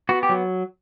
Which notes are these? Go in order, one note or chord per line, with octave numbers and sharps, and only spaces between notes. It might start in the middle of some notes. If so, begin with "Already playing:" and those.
B3 F#4
G4
F#3